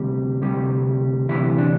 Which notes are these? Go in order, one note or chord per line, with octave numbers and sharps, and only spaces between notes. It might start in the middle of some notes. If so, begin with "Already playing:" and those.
Already playing: D2 C3 G3
D2 C3 G3
D2 C3 E3 G3 E4
D4